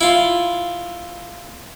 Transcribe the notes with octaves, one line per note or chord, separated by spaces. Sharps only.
E4 F4